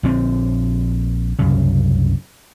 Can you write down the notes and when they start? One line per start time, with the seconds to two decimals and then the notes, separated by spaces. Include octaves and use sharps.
0.03 A#1 D3 C4
1.39 C2 F#2 C#3